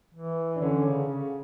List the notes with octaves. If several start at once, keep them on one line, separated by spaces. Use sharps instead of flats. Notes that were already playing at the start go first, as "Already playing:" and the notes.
E3
D4
D3 C#4
C#3
C#3